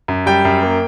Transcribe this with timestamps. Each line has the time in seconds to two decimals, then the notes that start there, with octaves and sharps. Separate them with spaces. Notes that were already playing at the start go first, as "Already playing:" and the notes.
0.08 F#2
0.26 G3 G5
0.45 F#2
0.62 A#3